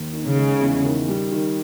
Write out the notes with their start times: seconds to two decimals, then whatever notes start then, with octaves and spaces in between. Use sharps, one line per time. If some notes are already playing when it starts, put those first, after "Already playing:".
Already playing: D#2
0.13 D#3
0.26 C#3
0.38 G#3
0.61 E2
0.84 D#3
1.09 G3
1.32 D#3